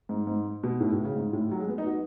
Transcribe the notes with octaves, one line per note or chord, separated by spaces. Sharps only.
G#2
G#2
B2
A2
A2
C#3
G#2
A2
F#3
G#3
B3
D#4
F#4